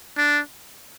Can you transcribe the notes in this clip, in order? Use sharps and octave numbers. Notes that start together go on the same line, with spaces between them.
D4